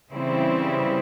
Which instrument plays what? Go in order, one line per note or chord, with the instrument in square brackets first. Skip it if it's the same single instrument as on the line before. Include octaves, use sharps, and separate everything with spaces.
[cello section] C#3 E3 G3 C4 E4